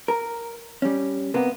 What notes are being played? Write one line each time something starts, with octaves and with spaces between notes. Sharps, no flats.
A#4
G3 C#4
C3 A#3 B3